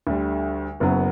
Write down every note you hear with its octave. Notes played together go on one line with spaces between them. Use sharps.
D2 D3 G3
F#1 F#2 C#3 F#3 B3